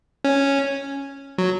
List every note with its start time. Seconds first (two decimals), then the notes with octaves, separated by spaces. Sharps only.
0.24 C#4
1.38 F#3